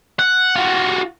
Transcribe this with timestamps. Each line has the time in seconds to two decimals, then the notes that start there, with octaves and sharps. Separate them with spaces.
0.19 F#5
0.56 F4 F#4